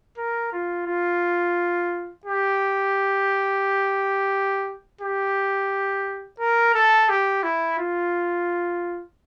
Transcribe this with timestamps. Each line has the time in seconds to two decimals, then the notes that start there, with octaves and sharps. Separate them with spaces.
0.18 A#4
0.53 F4
0.87 F4
2.26 G4
5.01 G4
6.40 A#4
6.75 A4
7.09 G4
7.43 E4
7.78 F4